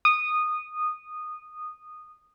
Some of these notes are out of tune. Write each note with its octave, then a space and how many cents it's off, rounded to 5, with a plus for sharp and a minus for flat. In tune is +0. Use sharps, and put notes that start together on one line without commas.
D#6 -15